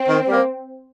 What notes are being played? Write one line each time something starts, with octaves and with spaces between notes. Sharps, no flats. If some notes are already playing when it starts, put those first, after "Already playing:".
Already playing: C4
D#3
G3 A#3